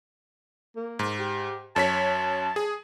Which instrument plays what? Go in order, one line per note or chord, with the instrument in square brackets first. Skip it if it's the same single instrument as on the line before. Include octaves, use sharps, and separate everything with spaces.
[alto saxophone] A#3
[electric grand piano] G#2
[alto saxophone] G4
[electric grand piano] F#2 C#5 B6 [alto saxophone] A5
[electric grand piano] G#4